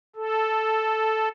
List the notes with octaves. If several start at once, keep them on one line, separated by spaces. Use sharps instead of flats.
A4